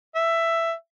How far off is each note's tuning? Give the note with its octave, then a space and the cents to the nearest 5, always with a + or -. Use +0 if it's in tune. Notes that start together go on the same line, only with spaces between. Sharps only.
E5 +10